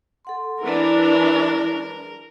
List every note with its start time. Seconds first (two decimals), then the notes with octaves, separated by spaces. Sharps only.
0.25 A4 F#5 C6
0.63 E3 D4 E4 A#4